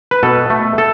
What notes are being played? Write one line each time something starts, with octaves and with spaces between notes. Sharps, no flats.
B4
B2 A4
A3
A4